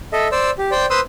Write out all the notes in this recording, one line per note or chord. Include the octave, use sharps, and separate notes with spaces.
A4 D#5 E5
C5 D5 E6
G4
C5 D5 G5
B4 C5 C6 D#6 E6